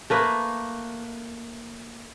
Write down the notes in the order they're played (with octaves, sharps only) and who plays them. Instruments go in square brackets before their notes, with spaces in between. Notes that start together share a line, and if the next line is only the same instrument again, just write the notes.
[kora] A3 A#3 B4